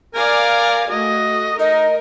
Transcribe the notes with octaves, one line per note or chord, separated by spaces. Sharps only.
A#4 D5 F5 G#5
A3 F#4 D#5
D#4 A#4 D#5